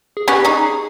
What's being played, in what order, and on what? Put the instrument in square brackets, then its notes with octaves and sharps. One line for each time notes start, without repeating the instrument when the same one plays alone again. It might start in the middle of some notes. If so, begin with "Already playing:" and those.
[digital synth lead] G#4
[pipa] B3 C#4 [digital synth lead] G4
[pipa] C#4 D#4 [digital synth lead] G#4
[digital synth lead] G#4